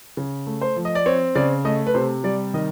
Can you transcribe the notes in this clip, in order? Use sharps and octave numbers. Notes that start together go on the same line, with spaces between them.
C#3
A3
C5
F3
D#5
D5
C4 C#5
C#3 D5
A3 D#5
B4
C3 C5
G3 D5
D#3 D#5